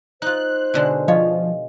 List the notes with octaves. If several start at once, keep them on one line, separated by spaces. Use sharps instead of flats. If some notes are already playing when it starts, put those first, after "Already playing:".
D#4 F4 C5 F#6
B2 D3 G#3
F3 C#5 D#5 F5